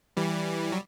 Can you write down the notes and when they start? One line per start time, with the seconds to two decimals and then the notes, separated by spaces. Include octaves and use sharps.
0.17 E3 G3
0.72 F#3